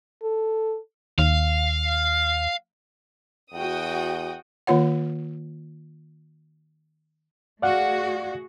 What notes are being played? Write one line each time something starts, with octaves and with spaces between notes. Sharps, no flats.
A4
D#2 F5
E2 F#4 G5 D#6
D#3 A#3 F4 C#5 F#5
A3 F#4 G#4 D5 F5 F#5